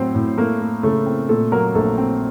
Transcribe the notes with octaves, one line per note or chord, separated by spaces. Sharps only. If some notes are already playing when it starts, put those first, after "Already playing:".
Already playing: A2 F#3 C4 C5
A2
A3 A#3 A#4
A3
C#3 A3 A4
C4
A#2 A3 A4
F#3 A#3 A#4
A#1 A3 A4
C4